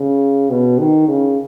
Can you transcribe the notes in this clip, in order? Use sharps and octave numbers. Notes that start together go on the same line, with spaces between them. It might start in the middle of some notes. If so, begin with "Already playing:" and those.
Already playing: C#3
B2
D#3
C#3